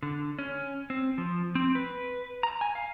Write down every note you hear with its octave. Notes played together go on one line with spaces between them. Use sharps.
D3
C#4
C4
F3
C4
B4
A#5
G#5
F5